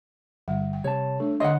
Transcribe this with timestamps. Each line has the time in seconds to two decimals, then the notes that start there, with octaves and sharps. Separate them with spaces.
0.48 G1 G3 F#5
0.73 G5
0.84 C3 C#5 A5
1.20 A3 D4 A4
1.40 D3 C#5 D#5 F#5 C6 D#6